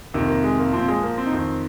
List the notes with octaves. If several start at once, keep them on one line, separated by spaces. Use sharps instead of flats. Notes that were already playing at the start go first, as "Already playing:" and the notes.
F2 C3 D#3 A#3
A#3
G#3
A#3
A#2 F3 C4
G#3
A#3
C4
D#4
F2 D#3 C4